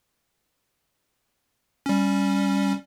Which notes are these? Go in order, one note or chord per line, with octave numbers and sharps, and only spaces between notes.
G3 C#4